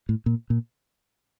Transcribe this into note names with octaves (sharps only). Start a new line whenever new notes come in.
A2
A#2
A#2